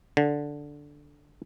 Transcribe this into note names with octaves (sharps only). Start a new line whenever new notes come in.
D3